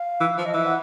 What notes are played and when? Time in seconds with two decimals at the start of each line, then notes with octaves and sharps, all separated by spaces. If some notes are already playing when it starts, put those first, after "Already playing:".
Already playing: F5
0.21 E3
0.38 F3
0.45 D#5
0.54 E3 E5
0.65 F#5